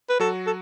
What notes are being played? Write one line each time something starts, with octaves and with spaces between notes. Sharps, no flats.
B4
F#3 F#4 A4
A4